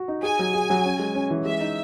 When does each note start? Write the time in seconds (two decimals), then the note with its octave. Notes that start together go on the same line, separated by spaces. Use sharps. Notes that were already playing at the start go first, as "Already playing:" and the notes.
Already playing: F#4
0.08 D#4
0.23 G#4 G#5
0.39 F#3
0.54 G#4
0.70 F#3
0.85 C#4
0.99 G#3
1.15 C#4
1.30 E3
1.46 G#3 E5
1.61 D#4